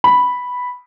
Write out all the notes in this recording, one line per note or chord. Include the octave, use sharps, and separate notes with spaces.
B5